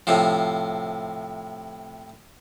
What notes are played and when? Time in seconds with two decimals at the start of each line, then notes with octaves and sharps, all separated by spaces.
0.07 A2 C3 F3